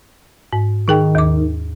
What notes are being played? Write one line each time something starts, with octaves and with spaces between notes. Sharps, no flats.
G#2
D#3 D#4 G#4 G5
D#2 D6